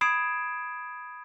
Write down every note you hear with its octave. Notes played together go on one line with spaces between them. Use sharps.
B5 D#6 G#6 C7 D7 E7